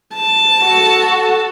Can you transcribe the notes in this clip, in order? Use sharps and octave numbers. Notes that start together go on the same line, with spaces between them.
A5
F#4 A4